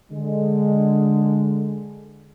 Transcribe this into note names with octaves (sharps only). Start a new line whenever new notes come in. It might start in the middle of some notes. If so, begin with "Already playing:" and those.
D3 G#3